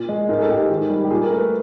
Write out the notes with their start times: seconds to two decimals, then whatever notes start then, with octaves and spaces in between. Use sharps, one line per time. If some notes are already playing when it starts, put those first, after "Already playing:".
Already playing: A#2
0.09 G#3
0.29 G#2 A#4
0.38 G#4
0.42 A4
0.50 G#2 G4
0.56 G#4
0.70 D#3
0.89 G3
1.05 G4
1.10 A#2 G#4
1.24 A#4
1.31 A3
1.37 B4